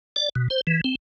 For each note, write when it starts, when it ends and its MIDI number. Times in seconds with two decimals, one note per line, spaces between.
0.16 0.29 74
0.35 0.48 47
0.50 0.61 72
0.67 0.81 52
0.84 0.95 60